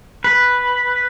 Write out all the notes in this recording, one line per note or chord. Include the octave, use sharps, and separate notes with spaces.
B4